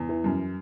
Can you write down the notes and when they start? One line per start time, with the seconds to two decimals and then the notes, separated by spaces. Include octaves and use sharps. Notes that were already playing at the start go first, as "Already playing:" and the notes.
Already playing: E2
0.09 E3
0.24 F#2